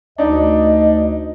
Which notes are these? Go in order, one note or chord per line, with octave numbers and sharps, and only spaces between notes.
D2 D4 D#4 D#5